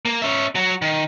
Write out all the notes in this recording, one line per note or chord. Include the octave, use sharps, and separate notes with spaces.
A#3
C#4 E5
F#3 F#4
D#3